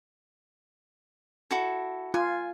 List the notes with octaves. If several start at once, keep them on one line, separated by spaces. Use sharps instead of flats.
E4 F#4 A4
F4 G#5